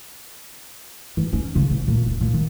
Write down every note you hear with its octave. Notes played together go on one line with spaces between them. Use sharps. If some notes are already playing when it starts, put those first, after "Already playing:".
E3
C#4
C#3
A1
A#2
D#1
A#2
D#3